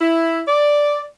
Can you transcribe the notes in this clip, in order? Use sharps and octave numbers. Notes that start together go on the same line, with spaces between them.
E4
D5